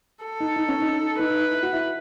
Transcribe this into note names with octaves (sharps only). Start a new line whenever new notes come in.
A4
D#4
D#4
C#4
D#4
D#4 B4
E4
F#4
E4